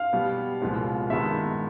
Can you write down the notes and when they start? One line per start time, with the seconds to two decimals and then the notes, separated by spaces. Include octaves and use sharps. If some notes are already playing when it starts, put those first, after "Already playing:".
Already playing: F5
0.13 B2 G3 B3
0.62 C2 A#2 F3 G#3 B3
1.10 G2 D#3 G#3 B3 E5